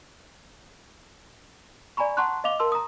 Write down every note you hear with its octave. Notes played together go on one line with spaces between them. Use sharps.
D5 G#5 A#5 B5 C#6
F#5 A5 A#5 C6 C#6 F#6
D#5 F5 D6 F7 G7
A#4 A5 C6 E6
A#5 D#6